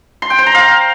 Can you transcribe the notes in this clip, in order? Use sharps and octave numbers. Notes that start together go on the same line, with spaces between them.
C6
G5
C5
A#5
F5